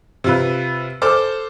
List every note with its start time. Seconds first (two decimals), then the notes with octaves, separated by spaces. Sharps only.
0.24 C3 F4 B4
1.02 A4 C5 D6 F6